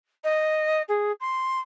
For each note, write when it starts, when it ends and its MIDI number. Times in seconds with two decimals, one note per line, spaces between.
0.24 0.82 75
0.88 1.12 68
1.20 1.59 84